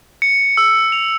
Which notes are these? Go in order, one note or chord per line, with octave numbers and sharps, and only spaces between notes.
C#7
E6
F7